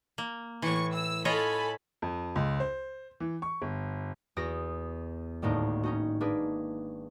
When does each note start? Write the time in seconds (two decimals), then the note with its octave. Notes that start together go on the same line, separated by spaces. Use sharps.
0.18 A#3
0.62 A2 E3 C#6
0.94 E6
1.25 F4 A4 C#5 D#5 G#5 B5
2.02 F2
2.36 C#2
2.60 C5
3.20 E3
3.42 C#6
3.62 G1
4.37 E2 F#4 D#6 A#6 D7
5.42 G#1 D2 A2 A#3 D#4
5.83 C#4 D#4 F#4
6.21 A#3 D4 G#4 B4